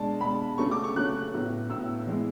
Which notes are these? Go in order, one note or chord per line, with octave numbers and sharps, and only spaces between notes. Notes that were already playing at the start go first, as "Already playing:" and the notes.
Already playing: B2 G#3 D4 A5
B2 G#3 D4 B5
C#3 F#3 A3 C#4 C#6
D6
C#6
C#3 F#3 A3 C#4 F#6
A2 F#3 B3
A2 F#3 B3 E6
E3 G#3 B3 E4